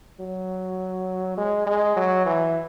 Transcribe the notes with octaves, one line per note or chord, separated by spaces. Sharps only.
F#3
G#3
G#3
F#3
E3